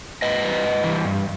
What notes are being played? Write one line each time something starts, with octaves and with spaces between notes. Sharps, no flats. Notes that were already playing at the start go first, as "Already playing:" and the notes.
G#2 B4 D#5
E3 G3
G#2
E3 G3
G2